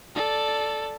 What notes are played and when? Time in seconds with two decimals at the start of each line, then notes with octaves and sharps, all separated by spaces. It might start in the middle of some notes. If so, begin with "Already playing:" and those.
0.15 A4 D5